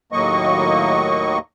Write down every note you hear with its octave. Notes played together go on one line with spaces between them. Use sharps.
D#2 A2 F#3 A#3 D#5 C#6